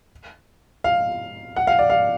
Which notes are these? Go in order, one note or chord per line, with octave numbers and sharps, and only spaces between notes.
F5
F#5
F5
D5
F5